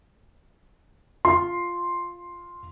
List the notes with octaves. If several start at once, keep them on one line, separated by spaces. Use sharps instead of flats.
F4 C6